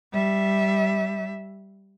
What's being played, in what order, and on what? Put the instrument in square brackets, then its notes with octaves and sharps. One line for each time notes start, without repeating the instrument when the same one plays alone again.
[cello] G3 E5